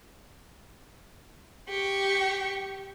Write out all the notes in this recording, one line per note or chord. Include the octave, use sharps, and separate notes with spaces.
G4 C#6